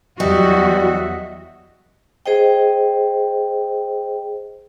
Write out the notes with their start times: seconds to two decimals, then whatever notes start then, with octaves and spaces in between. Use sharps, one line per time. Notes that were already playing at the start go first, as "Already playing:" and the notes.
0.20 E2 F#3 G3 F#4 D#5 E5 F#5
2.26 G#4 C5 D#5 G5